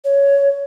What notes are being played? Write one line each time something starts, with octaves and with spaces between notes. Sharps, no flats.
C#5